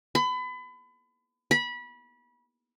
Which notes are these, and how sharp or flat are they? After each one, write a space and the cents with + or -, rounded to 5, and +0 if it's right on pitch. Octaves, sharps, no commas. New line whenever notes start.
B5 +30
B5 -25